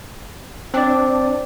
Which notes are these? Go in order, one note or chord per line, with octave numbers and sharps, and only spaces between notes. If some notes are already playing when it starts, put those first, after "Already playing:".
C4 D4 D5